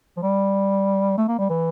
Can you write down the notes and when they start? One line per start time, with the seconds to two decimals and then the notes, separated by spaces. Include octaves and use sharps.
0.17 F3
0.22 G3
1.18 A3
1.28 A#3
1.38 G3
1.50 E3